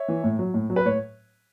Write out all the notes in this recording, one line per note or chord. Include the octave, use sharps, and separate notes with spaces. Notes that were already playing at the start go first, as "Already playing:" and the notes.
Already playing: C#5 E5
E3
A2
F#3
A2
F#3
B4
A2 C#5